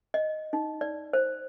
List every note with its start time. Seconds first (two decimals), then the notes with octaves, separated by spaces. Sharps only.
0.14 D#5
0.53 D#4
0.81 D5
1.13 C5